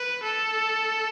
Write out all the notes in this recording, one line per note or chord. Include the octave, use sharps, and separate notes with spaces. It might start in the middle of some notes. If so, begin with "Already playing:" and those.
Already playing: B4
A4